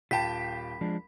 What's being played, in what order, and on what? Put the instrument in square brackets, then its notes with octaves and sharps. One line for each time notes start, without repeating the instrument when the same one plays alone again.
[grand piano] D#1 G5 A5 [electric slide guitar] F4 [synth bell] B5 B6
[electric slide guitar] F3 G#3 D4